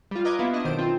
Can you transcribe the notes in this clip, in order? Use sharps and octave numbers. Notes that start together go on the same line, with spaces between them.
G3 F4
B4 D#5 A#5 D6 G#6
A#3 B3 E4 F4
D4 E4 D#5
B1 D#3 D#4 C5 D7
C4 F4